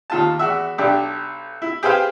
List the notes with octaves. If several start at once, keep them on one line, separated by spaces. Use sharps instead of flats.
D#2 F4 A5
E2 F#4 E5
B1 D4 G4
E4
G4 G#4 B4 C5 F5 G5